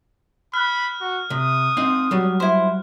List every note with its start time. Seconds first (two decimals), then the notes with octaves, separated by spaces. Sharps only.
0.54 B5 F6 F#6
1.01 F#4
1.30 C3 D#6
1.77 C4 D#4 F5
2.11 F#3 G3
2.40 E4 C5